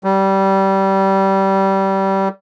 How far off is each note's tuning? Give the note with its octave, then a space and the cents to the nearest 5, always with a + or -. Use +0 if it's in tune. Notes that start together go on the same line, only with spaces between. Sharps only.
G3 -20